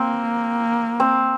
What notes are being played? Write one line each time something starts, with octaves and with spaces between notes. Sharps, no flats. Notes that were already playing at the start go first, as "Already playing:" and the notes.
Already playing: A#3 C4
C4